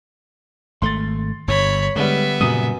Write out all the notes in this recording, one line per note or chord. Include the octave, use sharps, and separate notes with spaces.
G#1 A3 C6 A6
G1 G2 C#5 B5
D3 G3 G#3 B3 E5
F#2 A#2 C#3 G3 D#6 D#7